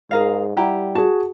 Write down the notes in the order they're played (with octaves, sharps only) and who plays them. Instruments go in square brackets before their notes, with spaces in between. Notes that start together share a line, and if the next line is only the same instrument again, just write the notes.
[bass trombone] G#2 [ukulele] G#4 A#4 F5
[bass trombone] G3 [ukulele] E4 G4 A#5 [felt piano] F#5
[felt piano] F#4 G#4 [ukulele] A5